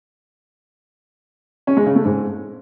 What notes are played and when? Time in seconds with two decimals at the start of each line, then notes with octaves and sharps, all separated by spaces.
1.67 C#4
1.77 G#3
1.86 C#3
1.96 A3
2.05 G#2